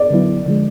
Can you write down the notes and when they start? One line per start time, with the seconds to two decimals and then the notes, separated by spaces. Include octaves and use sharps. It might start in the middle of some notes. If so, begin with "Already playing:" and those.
Already playing: D5
0.11 D3 F#3 B3 E4
0.46 D3 F3 G#3